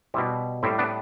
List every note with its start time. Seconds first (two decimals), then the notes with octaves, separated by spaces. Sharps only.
0.14 G3 C4 E4
0.18 B2
0.63 A2 G3 C4 E4
0.79 B3 D4